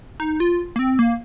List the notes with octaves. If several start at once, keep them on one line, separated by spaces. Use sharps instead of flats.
D#4
F4
A#3
C4
A#3